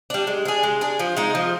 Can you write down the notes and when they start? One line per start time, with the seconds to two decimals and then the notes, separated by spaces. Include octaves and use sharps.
0.10 G3 D4
0.27 G#3
0.45 D4 G#4
0.63 G#3
0.81 D4 G#4
0.99 F3
1.17 G#3 D#4
1.35 F3